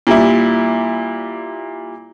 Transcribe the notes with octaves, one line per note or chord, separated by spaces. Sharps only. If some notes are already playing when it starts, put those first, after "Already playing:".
A#2 G3 E4